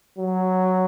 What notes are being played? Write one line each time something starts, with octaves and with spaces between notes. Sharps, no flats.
F#3